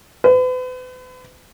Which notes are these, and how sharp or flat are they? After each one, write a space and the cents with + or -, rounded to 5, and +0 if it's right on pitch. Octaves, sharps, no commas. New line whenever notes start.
B4 +40